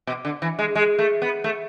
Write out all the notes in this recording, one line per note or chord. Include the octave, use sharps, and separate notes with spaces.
B2
D3
E3
G#3
G#3
A3
B3
A3